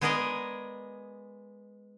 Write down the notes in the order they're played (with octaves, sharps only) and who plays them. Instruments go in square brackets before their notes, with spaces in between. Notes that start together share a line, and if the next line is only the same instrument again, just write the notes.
[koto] G#3 B3 G#4 A#4 D5 D#5